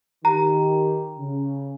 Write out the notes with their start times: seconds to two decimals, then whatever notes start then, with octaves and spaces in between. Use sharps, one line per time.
0.25 D#3 G4 A#5
1.18 C#3